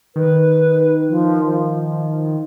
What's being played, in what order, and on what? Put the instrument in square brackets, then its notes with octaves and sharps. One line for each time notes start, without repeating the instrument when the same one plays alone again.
[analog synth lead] D#3 [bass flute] B4
[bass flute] F3
F3